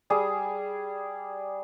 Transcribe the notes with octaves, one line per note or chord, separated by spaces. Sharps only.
G3 G#4